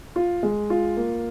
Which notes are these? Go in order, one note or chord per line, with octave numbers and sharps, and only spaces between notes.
F4
G#3
F4
A#3